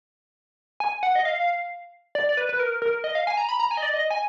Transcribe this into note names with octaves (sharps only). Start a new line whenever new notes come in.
G#5
F#5
D#5
F5
D5
D5
B4
B4
A#4
A#4
D#5
F5
G#5
A#5
B5
A#5
G#5
D#5
D5
D#5
G#5